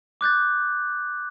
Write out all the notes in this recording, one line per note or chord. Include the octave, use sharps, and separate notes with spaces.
D6 F#6 G6 A6